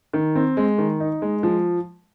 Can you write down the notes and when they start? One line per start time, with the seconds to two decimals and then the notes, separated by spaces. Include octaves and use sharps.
0.13 D#3
0.35 C4
0.57 G#3
0.78 D#3
1.00 D#4
1.22 G#3
1.43 F3